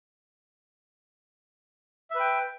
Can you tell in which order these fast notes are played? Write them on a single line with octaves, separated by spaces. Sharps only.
E5 B4 G5